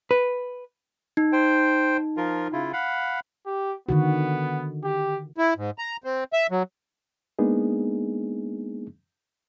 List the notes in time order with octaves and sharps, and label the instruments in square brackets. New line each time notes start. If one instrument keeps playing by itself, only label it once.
[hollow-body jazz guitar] B4
[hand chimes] D#4
[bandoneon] C5 G5
F3 F4 A#4
C#3 E4 F4
F5 F#5 B5
[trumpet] G4
[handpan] D3 D#3 F#4 [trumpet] B3
[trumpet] G4
[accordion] E4
G#2
A#5
C4
E5
F#3
[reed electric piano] G#3 A#3 B3 D4 D#4 G#4